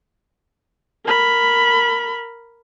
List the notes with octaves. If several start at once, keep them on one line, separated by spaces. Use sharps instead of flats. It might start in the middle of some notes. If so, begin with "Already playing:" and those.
A#4 B5